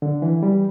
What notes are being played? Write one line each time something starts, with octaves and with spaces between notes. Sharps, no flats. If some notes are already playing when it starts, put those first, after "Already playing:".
D3
E3
G3